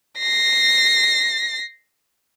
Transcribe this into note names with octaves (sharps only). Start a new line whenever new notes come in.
A#6 C7